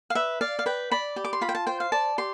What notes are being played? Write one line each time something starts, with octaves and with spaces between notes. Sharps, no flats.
F5
B4 E5
D5 F5
F5
B4 G5
D5 B5
G4
D6
C6
F4 B5
G5
A5
C5 G5
F5
D5 A5
G4 C6